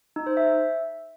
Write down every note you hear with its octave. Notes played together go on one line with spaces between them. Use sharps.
D#4
C5
E5